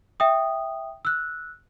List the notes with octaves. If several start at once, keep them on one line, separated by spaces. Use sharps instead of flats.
E5 G5 D#6
E6 F#6